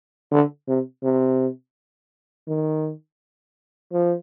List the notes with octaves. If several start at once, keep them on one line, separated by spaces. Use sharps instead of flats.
D3
C3
C3
D#3
F3